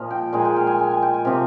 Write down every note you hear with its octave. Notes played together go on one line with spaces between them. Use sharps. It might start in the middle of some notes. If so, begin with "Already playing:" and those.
Already playing: A#2 F3 A#3 D#5 F5
G5
A#2 G#3 G#5
G5
F5
G#5
G#5
G#5
G5
G#5
C3 F3 A#3 F5